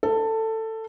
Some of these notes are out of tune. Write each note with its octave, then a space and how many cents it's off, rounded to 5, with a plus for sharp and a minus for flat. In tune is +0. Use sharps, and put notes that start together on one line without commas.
A4 +15